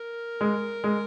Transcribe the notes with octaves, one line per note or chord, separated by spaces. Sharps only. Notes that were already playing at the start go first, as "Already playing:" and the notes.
Already playing: A#4
G#3
G#3